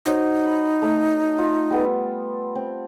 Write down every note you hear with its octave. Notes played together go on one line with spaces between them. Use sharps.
D#4 F#4 C5 C#5
B5
A3 A#5 E6
F4 D#5
G3 B3 A4
C4